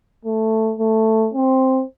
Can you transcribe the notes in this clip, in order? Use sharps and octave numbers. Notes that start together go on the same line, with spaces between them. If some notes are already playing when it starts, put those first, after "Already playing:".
A3
A3
C4